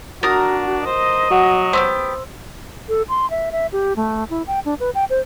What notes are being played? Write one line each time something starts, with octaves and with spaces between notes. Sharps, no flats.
D4 F#4 A#4 D#6 A6
C5 D#5
F#3 F#4 F#5
B3 F#4 G4 C5 C6 E6
A4
C6
E5
E5
G4
A3
E4
G5
D4
B4
G5
C5